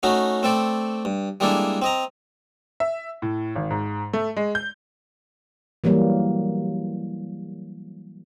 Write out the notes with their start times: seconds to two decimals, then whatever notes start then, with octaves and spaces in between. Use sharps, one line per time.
0.03 A3 C#4 D#4 F#4
0.43 A3 C4 A4 D5
1.05 G2
1.40 G3 G#3 A#3 D4 E4 A4
1.82 C4 D#5 A#5
2.80 E5
3.22 A2
3.56 G#1
3.71 G#2
4.13 A3
4.37 G#3
4.55 G6
5.84 E3 F#3 G3 A#3